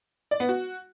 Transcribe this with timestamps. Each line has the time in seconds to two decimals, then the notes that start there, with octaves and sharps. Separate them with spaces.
0.31 D5
0.40 B3
0.49 F#4